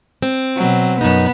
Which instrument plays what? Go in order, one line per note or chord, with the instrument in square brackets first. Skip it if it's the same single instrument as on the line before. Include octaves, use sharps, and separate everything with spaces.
[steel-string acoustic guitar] C4
[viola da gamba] B2 F#3
[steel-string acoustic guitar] F#2 D#4 [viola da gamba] B3